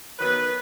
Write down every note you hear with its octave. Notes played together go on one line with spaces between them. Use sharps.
D#3 F#3 B3 B4